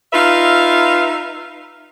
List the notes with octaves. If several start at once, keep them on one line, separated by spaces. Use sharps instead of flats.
D#4 F4 B4 E5 F5